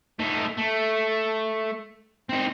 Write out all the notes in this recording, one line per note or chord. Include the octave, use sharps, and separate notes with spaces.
A3 D#4
A3
C4 D#4